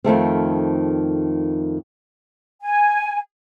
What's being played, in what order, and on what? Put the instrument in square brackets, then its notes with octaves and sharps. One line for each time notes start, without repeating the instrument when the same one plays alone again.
[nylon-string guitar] F2 D#3 A3 C4
[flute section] G#5